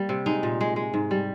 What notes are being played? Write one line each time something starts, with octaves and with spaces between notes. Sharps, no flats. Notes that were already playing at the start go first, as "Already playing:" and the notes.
Already playing: G3 A#3
C3
G#3 D#4
A#2
G#3
G#3
G#2
G3